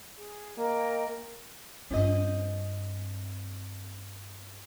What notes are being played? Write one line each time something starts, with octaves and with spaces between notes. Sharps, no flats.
G#4
A#3 A#4 D#5 G5
G2 C4 F4 D#5